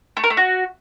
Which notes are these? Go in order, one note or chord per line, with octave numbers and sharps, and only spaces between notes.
A3
A#4
A3
F#4